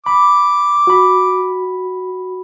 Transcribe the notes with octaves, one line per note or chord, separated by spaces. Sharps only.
B5 D6
F#4 B5